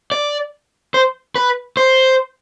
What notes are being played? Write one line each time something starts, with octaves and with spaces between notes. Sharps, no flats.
D5
C5
B4
C5